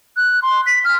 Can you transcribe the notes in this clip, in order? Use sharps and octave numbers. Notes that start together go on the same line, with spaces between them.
F#6
C6
B6
F6